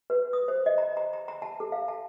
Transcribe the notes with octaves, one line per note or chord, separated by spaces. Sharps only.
B4
D#6
C5
D#5
A#5
A#5
A#5
A#5
A5
A4
F5
A5